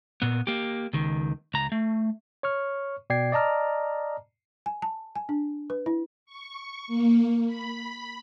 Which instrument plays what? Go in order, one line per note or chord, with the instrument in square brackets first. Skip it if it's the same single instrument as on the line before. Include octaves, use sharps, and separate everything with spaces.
[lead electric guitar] A#2 B3
A#3 G4
C#2 D#3
C#2 A#5
A3
[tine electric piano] C#5 C#6 F6
B2 D5 G5 G#6 C7
D5 D#5 A5 A#5 F6
[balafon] G#5
A5
G#5
D4
B4
E4
[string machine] C#6
A#3
B5